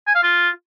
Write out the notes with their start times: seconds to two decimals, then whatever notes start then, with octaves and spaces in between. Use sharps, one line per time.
0.07 G#5
0.15 F5
0.23 F4